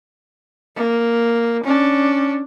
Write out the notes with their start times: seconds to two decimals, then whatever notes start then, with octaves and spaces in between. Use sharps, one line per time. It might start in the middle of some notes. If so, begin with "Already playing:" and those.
0.76 A#3
1.63 C#4 D4